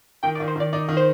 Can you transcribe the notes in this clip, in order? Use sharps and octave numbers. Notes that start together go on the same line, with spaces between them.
D#3 G5
D5
D#3
C5
D#3 D5
D#4 D5
D#3
C5